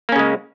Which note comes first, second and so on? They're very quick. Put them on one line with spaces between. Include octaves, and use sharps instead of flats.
A#3 C#4 C#3 G#3